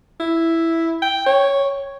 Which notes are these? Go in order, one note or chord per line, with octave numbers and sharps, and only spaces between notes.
E4
G5
C#5